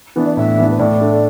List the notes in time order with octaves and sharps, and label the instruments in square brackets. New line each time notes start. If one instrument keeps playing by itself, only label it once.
[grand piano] E3 B3 D4
[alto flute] D5
[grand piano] A2 [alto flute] E5
[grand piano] E3 B3 D4
[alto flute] B4
[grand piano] A2 [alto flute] D5
[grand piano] A3 D4